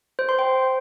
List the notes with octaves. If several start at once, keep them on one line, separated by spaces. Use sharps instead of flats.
C5
C6
G5